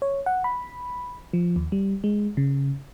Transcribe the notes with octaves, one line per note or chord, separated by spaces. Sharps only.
C#5
F#5
B5
F3
D#2
G3
G#3
C#3